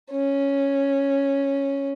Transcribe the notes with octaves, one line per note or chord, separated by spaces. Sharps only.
C#4